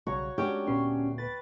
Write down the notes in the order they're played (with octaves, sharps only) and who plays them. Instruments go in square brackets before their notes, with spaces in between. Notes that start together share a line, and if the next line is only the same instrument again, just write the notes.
[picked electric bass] B1 C#3 G3 [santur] F#4 C#5 A#5
[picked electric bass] G#3 [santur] C#4 G5 [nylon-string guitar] D4 F#4 G4
[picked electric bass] D2 A#2 B3 [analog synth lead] C#4 [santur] C6
[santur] B4 [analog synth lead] A6